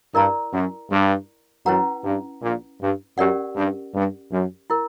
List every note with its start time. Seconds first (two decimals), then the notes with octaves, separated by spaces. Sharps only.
0.14 G2 E4 A#4 D5 A#5
0.53 F#2
0.90 G2
1.66 F#2 C#4 E4 B4 F#5 A#5
2.04 G2
2.42 A#1 A#2
2.80 G2
3.17 F#2 C#4 G4 A#4 D5 F#5
3.56 G2
3.94 G2
4.31 F#2
4.70 E4 A#4